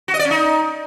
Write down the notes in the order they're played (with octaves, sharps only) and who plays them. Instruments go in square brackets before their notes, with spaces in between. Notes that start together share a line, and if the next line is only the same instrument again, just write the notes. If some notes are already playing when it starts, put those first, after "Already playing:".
[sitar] F#4
D#5
D5
C#4
D#4